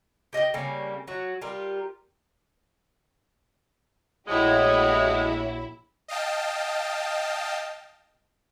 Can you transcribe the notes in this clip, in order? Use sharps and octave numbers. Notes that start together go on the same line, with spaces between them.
G4 D#5 F5 G5
C#3 G3 A#3 C#4
F#3 F#4
G3 F4 G4 A#4
A#1 A2 G#3 E4 F#4 G4 C#5
D#5 F5 G5 A5